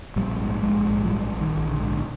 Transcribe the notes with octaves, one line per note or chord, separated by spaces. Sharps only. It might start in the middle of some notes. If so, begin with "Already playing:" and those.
A#1 G3
G#2
A#1 G#3
G#2
F3
A#1 G3
A#1
D#3
A#1
D3
G#2